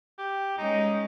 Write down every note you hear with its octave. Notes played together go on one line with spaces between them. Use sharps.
G4
G#3 C#4 D#4